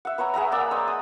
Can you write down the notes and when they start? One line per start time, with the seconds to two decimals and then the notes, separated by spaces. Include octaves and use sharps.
0.05 E5 F#5
0.18 B3 C#5 F#5 A#5
0.34 G#4 E5 F#5 A#5
0.52 A#3 D5 F#5 E6
0.71 C5 D#5
0.88 D#6